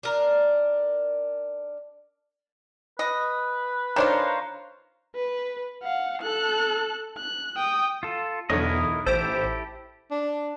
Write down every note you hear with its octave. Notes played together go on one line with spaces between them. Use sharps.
D4 A#4
B4 D#5
D#3 D4 F4 C5 C#5 A#5
B4
F5 F#5
A4 F#6
F#6
G5 D#6
F4 A4
B1 E2 D3 E4 A#4 C#5 D#5
A1 E4 G4 A4 C5
D4